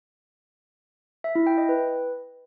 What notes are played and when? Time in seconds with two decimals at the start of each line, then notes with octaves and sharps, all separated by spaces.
1.24 E5
1.35 E4
1.47 G5
1.58 D#5
1.69 B4